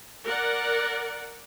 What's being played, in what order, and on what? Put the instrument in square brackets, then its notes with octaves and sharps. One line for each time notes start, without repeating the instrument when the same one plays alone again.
[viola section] A#4 D5 F#5